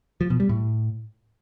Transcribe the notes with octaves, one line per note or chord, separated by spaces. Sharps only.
F3
B2
G3
A2